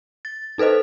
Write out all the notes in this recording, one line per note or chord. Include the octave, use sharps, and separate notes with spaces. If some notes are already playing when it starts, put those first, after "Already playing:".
A6
D#4 A4 B4 C5 D#5